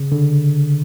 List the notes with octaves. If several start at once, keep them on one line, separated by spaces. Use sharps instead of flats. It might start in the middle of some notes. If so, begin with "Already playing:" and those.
Already playing: C#3
D3